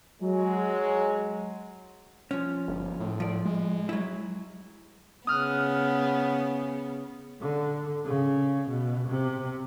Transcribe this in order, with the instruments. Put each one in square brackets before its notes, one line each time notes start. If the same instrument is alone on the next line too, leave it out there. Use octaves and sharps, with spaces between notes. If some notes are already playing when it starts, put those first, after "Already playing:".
[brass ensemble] F#3 G#3
[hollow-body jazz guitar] F3 C#4
[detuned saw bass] G1
A2
[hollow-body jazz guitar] F3 D5
[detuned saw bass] G#3
[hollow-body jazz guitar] F#3 E4
[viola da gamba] C#3 B3 [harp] D#6 F6 F#6
[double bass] D3
C#3
B2
C3